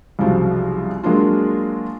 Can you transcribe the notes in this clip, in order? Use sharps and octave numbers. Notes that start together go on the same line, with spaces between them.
C2 C#3 F3 F#3 F#4
F#3 G#3 A#3 D4 F4